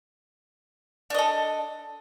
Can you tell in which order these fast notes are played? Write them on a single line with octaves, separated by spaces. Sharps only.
D4 D#5 A4